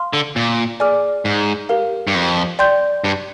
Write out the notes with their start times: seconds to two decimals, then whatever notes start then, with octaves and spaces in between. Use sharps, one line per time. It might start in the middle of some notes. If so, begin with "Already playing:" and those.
Already playing: F5 C6 F6
0.13 D3
0.36 A#2
0.80 G#4 D5 G#5 D6 F6
1.25 G#2
1.69 G4 A#4 F5
2.07 G2
2.15 F2
2.59 D5 G5 C6 G6
3.04 G2